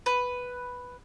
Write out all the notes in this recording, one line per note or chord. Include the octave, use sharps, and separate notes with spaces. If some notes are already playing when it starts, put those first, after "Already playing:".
B4